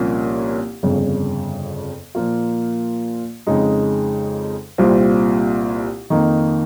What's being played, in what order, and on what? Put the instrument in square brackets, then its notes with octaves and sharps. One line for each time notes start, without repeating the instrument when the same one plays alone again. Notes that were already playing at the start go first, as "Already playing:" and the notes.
Already playing: [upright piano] C2 A#2 F3 A#3 C#4
G1 F2 C#3
A#2 F3 A#3 F4
F2 C#3 G#3 D#4
C2 A#2 G3 C4 F4
F2 D#3 A#3 D#4